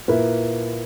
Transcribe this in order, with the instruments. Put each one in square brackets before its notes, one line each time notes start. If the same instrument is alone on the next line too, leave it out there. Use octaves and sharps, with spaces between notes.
[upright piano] A#2 A#3 E4 B4